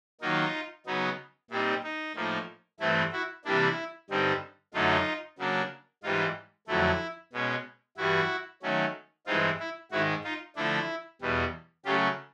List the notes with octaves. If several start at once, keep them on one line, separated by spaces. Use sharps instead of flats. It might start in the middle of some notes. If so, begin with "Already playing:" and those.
D#3 F#3 A#3 D#4 F4
C#3 F#3 B3 D#4
A#2 G3 C4 D#4 E4
D#4
A2 F3 A#3 D#4
G2 E3 A3 C4 E4
E4 F#4
C3 E3 G3 A#3 D4 E4
G2 D3 G3 C4 D#4
F#2 D3 F#3 A3 D#4 F4
C#3 F#3 A#3 D4
G#2 E3 G3 D#4 F4
F2 D3 F#3 A3 E4
B2 G#3 C#4
G2 E3 G3 E4 F#4
D#3 F#3 A3 C#4
G2 E3 G#3 C4 D#4 F4
E4
G#2 D#3 G#3 E4 F#4
D#4 F4
D3 F3 A3 D4 E4
E2 B2 G3
C#3 F#3 A3 C#4 F4 G4